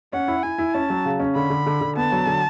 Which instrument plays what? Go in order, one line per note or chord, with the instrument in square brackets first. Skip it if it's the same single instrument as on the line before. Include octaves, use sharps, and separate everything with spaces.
[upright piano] C#4 [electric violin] F#5
[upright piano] E4
[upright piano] E4 [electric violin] G#5
[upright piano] E4
[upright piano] C#4 [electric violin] A5
[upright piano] F#3
C#3
C#4
[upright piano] D3 [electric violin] B5
[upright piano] D3
D3
D3
[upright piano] B3 [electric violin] A5
[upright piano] F#3
D3